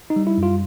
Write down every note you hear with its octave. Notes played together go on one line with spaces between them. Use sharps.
D#4
G3
E4
F#2
F4